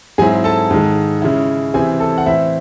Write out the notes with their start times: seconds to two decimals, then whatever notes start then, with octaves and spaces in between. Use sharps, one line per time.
0.18 G#2 F#3 C4 E4 G#4 G#5
0.44 A4 A5
0.71 G#2 D#3 G#3
1.22 C#3 G#3 C#4 E4
1.74 C3 E3 C4 E4 G#4 G#5
2.00 A4 A5
2.18 F#5
2.26 A2 E3 C4 E4 E5